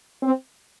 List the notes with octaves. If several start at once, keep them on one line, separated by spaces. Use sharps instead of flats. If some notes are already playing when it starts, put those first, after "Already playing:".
C4